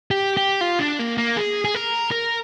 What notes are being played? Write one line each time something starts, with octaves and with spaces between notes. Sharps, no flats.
G4
G4
F4
D4
A#3
A#3
G#4
G#4
A#4
A#4